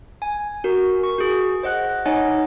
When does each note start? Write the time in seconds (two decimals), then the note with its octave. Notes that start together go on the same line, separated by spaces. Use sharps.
0.22 G#5
0.64 F#4 A#4
1.04 C#6
1.18 F#4 G#4
1.63 C5 D#5 F#5 F#6
2.06 D#4 C#5 D#5 F#5 G#5